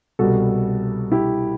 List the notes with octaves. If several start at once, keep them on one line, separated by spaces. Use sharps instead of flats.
C2 B2 G3 F#4 A4
E4 G4